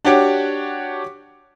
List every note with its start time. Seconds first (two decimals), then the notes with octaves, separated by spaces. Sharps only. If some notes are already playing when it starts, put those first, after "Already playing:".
0.05 D4 F#4 G4 C#5 D6